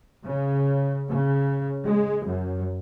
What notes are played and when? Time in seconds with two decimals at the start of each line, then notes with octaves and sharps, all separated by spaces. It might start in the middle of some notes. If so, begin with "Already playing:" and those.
0.23 C#3
1.09 C#3
1.85 G#3
2.25 F#2